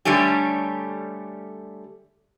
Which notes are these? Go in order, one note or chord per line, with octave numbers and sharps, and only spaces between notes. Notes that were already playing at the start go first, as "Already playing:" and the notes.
D3 G3 A3 C#4 G4